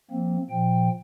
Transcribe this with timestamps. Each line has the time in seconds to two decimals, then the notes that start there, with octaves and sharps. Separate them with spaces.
0.11 F3 A#3 C4
0.50 A#2 F3 G5